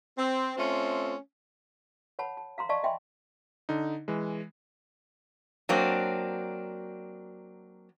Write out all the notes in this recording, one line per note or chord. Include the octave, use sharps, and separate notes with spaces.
C4
A3 C4 C#4 F4
C#5 F#5 A5 B5
A5
F5 A#5 C6
D5 D#5 F5 A5 C#6
D#5 E5 G5 G#5 B5 C6
D3 D#4
E3 G#3
F#3 A#3 C4 D4